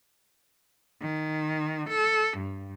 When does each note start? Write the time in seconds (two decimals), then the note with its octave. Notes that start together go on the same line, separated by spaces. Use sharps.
1.02 D#3
1.90 A4
2.38 G2